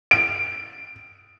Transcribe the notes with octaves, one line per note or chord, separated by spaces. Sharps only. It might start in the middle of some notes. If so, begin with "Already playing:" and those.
D7